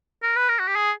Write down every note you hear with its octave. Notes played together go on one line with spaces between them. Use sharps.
A#4
B4
A#4
F#4
G4
G#4